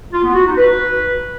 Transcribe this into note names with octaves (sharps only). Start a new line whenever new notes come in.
F4
B3
F#4
D#4
B4